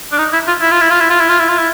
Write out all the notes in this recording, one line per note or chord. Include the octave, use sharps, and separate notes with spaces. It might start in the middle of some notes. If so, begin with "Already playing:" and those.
D4
D#4
E4
F4
E4
F4
E4
F4
E4
F4
E4
F4
E4
F4
E4